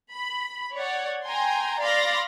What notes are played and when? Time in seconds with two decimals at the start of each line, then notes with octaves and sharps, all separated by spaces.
0.13 B5
0.77 C#5 D5 F#5
1.25 G5 G#5 A#5 C6
1.80 D5 F5 B5 C6 D6 A#6